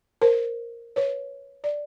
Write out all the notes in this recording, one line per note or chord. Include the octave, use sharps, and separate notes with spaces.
A#4 C5
B4 C#5
D5